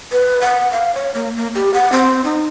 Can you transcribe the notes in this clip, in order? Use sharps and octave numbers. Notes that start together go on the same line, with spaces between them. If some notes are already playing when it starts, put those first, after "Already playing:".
B4
F#5
F5
C#5
A#3
A#3
G4
F#5
C4
D#4